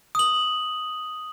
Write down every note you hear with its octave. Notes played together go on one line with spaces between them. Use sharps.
D#6 F#7